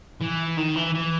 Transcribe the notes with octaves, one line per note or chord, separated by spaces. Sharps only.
E3
D#3
E3
E3